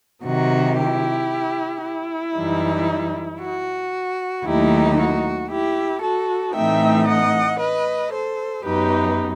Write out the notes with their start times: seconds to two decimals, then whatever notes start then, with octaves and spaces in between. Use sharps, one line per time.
0.25 C3 D#3 F#3 F#4
0.77 E4 G4
1.83 E4
2.36 F#2 E3 G3 D#4
3.40 F#4
4.44 D#2 D#3 F#3 A3 D#4 E4 G4
4.97 F#4
5.50 E4 G4
6.02 F#4 A4
6.54 A2 E3 A3 C4 D#4 E5 G5
7.06 D#5 F#5
7.59 B4 D#5
8.11 A4 C5
8.64 F#2 F#3 B3 D#4 G4 B4